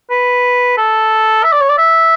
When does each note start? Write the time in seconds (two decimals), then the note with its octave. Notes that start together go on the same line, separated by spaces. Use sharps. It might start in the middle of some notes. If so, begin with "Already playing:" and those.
0.10 B4
0.77 A4
1.44 E5
1.53 D5
1.61 C#5
1.69 D5
1.78 E5